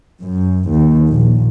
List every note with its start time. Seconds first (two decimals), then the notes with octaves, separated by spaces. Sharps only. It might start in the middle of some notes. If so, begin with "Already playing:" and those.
0.21 F#2
0.70 D#2
1.10 A#1